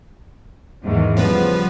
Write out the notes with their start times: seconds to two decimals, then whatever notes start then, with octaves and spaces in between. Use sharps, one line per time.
0.84 E2 G#2 D#3
1.17 C#3 F3 G3 B3 B4